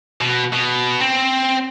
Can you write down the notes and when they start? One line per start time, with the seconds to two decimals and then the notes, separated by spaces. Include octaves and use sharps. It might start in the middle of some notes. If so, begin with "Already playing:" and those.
0.21 B2
0.53 B2
1.01 C4